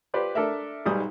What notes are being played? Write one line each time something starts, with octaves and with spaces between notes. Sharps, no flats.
F4 G4 B4 C5 D5
D4 A4 A#4 E5
B1 G#2 G3 G#4 D#6